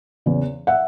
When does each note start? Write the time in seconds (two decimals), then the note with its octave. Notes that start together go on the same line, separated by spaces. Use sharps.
0.26 E2 C#3
0.67 E5 F#5